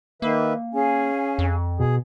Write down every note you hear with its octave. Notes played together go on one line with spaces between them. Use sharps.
D#3 A#3 B4 E5
C#4 G#4 F5 G#5
F2
B2 G#4